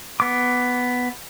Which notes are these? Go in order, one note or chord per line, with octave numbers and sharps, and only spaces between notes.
B3 D6